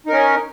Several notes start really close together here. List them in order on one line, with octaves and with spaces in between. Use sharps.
D#4 A#4 C#4